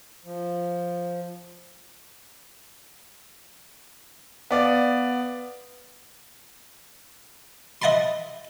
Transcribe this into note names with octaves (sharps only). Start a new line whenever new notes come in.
F3
B3 D5 F5
D#5 E5 F#5 A5 B5 C6